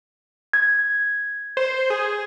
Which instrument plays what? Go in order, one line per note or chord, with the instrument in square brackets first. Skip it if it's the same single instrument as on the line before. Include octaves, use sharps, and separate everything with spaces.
[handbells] G#6
[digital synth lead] C5
G#4